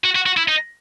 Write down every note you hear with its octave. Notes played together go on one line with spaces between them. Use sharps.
F#4
F#4
F#4
E4
D#4